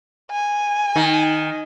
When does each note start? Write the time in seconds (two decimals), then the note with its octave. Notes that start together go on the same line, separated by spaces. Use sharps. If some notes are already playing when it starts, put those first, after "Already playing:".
0.31 G#5
0.96 D#3